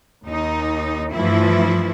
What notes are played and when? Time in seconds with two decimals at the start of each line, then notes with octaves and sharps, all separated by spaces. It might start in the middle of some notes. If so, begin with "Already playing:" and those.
0.24 D#2 D#4
1.12 G2 E3 F3 A3 E4